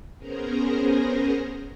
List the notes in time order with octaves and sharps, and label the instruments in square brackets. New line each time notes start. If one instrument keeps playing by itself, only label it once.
[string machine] B3 C#4 G#4 A#4 C5 A#5